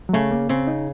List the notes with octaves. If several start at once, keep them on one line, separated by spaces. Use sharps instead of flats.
F#3
C#3 A3
A#3
C#3 C4
D#4